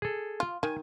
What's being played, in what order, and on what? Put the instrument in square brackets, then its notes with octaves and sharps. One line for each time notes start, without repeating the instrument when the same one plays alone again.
[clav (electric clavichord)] G#4 A4
[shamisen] F4
[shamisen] D#3 [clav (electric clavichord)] G#5